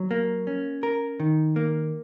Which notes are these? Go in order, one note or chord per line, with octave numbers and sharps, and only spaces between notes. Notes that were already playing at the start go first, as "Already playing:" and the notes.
Already playing: F#3
A#3
C#4
A#4
D#3
A#3